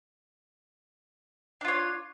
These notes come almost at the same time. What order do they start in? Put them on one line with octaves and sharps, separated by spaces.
D4 F4 C#5